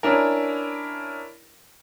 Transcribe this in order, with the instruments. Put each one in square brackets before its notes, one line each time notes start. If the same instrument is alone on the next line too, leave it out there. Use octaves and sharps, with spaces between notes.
[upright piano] C#4 D4 E4 A#4